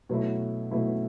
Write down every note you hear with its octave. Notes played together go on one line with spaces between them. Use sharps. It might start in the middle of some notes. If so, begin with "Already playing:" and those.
B2 F#3 A3 E4
B2 F#3 A3 E4